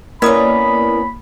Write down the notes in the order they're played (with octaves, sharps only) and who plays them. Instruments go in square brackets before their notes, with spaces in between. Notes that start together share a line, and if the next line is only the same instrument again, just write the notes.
[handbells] A#3 D#6 [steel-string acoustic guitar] B3 C#4 [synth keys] E4 A#4 D5 [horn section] B5